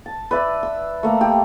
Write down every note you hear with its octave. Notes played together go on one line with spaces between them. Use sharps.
A5
B4 D5 E5
E6
A3 A#3
G4